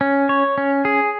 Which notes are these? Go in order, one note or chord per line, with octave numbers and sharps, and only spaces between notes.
C#4
C#5
C#4
G#4